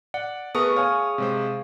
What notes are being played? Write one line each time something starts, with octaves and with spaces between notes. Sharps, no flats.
D5 F#5
A3 B3 G#4 A#4 B4 D#6
C#5 F5 G#5
C3 G#3 C5